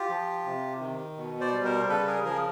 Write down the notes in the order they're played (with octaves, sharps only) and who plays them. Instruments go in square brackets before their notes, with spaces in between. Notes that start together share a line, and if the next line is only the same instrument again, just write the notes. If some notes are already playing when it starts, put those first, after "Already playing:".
Already playing: [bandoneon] F4 G4
F3
C3
D#3
B2
C5 D5
G3
A#4 C5
C#3 A4 B4
G#4 A#4
F3 G#4 A#4